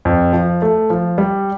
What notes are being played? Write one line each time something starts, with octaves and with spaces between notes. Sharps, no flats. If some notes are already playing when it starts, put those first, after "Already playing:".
F2
F3
A3
F3
G3